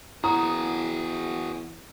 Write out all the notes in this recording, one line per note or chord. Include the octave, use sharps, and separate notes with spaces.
E2 E4 F#4 G#4 A#5 D#6